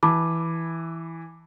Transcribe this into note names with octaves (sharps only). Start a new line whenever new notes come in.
E3 A5 B5 D6